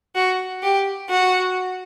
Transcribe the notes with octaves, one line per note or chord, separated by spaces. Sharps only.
F#4
G4
F#4